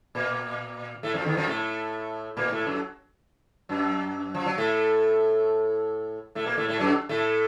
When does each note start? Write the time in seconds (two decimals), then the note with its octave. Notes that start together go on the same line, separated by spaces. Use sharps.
0.15 A#2 A#3
1.03 A2 A3
1.14 F2 F3
1.26 D#2 D#3
1.36 F2 F3
1.48 A2 A3
2.37 A#2 A#3
2.51 A2 A3
2.66 F#2 F#3
3.69 F#2 F#3
4.34 F3
4.46 F#3
4.58 A2 A3
6.35 A2 A3
6.46 A#2 A#3
6.58 A2 A3
6.68 A2 A3
6.79 F#2 F#3
7.09 A2 A3